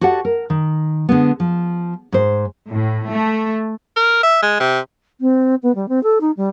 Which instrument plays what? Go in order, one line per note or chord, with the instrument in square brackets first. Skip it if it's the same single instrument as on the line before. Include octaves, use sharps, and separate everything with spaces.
[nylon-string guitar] F#4 G4 A4 D5 F#5
A#4
D#3
D3 G#3 B3
F3
G#2 C5
[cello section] A2
A3
[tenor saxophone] A#4
E5
G#3
C3
[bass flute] C4
B3
G3
C4
A4
D#4
G3